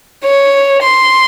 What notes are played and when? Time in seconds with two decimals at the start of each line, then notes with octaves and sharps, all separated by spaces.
0.24 C#5
0.82 C6